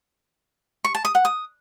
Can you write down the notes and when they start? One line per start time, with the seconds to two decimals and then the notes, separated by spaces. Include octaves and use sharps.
0.85 C#6
0.95 A5
1.05 D#6
1.15 F#5
1.25 D#6